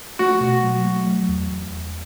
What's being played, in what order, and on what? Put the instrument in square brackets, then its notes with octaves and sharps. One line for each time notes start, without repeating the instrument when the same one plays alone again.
[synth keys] A3 [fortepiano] F#4
[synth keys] B2
F#3
A3
F#3
E2